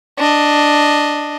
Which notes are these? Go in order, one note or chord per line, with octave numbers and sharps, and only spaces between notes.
D4 D#5